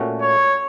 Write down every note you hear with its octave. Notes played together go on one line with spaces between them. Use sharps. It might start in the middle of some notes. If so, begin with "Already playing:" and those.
Already playing: A#2 A3 C#4 F#4
C#5